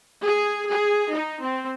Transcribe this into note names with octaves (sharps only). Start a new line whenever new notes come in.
G#4
G#4
D#4
C4